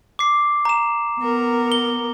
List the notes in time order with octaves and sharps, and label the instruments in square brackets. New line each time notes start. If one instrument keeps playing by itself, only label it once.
[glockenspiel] D6 C7
A#5 E7
[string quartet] B3 A#4
[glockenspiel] G7